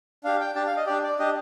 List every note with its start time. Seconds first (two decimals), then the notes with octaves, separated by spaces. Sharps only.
0.24 D4 G4 F5
0.40 G5
0.55 D4 G4 A5
0.67 F5
0.77 D#5
0.87 D4 G4 D5
1.03 D5
1.19 D4 G4 D#5